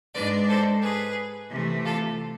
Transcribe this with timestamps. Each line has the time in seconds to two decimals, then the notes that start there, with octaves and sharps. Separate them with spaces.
0.14 G#2 G#3 D4 B4 D5
0.48 A4 C5
0.82 G#4 B4
1.51 C3 E3 A3
1.85 F4 A4